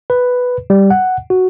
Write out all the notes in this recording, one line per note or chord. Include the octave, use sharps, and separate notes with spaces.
B4
G3
F#5
F#4